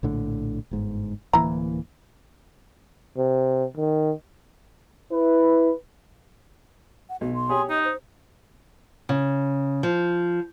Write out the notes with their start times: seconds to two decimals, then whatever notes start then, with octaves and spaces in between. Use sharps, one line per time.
0.03 A#1 A2 D3
0.71 G1 G#2
1.33 D1 E3 A#3 E4 A#5
3.17 C3
3.77 D#3
5.12 E4 B4
7.09 F#5
7.21 B1 F#4
7.35 C6
7.49 G4 G#4 C#5
7.69 D#4 D#5
7.85 C5
9.09 C#3
9.83 F3